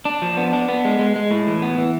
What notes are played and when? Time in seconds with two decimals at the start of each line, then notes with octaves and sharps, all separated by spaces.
0.05 D4
0.22 F3
0.37 B3
0.53 D4
0.68 B3
0.85 G#3
0.99 G#3
1.16 G#3
1.31 A2
1.47 E3
1.62 B3
1.78 E3